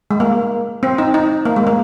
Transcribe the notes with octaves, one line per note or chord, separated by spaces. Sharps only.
G#3
A#3
C4
D#4
D#4
A#3
G#3
A#3